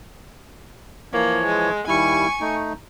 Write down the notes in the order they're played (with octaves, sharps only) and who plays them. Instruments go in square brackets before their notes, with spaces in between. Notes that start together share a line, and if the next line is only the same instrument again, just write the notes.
[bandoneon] E3 F3 C#5 [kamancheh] A#3
[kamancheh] G#3
[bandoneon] D#2 G3 E4 [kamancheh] G#5 C#6
[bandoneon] A3 D#4